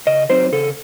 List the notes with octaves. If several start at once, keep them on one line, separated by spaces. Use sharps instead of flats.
C#3 D#5
F#3 C4 D#4 C5
C#3 A4